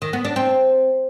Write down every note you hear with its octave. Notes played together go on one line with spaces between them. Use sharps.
D#3
B3
D4
C4